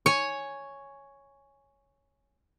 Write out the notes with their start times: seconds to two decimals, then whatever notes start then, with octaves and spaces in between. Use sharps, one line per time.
0.06 C#5 G#5